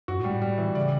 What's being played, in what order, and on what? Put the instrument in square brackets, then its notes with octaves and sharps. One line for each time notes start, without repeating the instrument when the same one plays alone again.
[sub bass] F#2 [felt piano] F#4
[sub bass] A2
[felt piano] G3
[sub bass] A2
[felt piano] G3
E3
[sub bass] C#3 [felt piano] D5